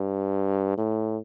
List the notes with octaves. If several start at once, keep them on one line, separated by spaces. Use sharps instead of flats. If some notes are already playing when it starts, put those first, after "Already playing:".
Already playing: G2
A2